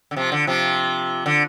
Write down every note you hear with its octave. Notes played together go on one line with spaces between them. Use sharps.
D3
C3 F3
D3
C3 F3
D3